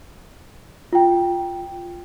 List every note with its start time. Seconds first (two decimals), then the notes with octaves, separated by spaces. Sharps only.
0.93 F4 G5